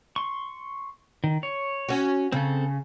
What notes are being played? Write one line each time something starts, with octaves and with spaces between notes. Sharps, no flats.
C6 C#6
D#3
C#5
C#4 F#4
C#3 C4 A4